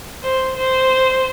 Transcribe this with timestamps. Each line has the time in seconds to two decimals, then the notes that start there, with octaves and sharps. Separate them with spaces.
0.23 C5
0.56 C5